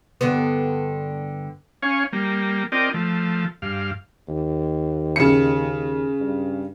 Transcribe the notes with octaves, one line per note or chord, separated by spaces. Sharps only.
G2 D3 B3
C#4 C#5 F5 G#5
G3 A#3
C4 F4 A#4 D5 D#5 G5
F3 A3
G2 F5
D#2
C#3 C#7
G2